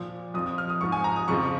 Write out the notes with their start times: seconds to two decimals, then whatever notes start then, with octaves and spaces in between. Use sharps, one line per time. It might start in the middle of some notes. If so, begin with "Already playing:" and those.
Already playing: A#2 F3
0.34 F2 F3 D#6
0.46 D#6
0.58 F6
0.70 D#6
0.81 G#2 F3 C#6
0.92 G#5
1.04 A#5
1.16 D#6
1.28 F2 C#3 F3 C#6